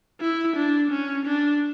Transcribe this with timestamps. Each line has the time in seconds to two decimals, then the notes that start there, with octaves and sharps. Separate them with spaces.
0.21 E4
0.56 D4
0.91 C#4
1.25 D4